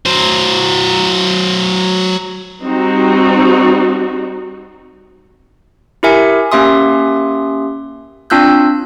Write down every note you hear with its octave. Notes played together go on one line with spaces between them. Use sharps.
F#3 C5
G3 C4 D#4 F#4
E4 G4 A#4 E5 G#5 C#7
A#3 C#4 G4 E5 C6 D#6
C4 D4 F4 E6 F#6 G6